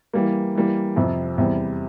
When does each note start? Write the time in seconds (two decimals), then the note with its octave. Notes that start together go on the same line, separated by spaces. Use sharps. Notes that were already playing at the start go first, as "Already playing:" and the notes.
0.13 E3 G3 A#3
0.55 E3 G3 A#3
0.96 F2 C3 F3
1.38 E2 C3 G3 C4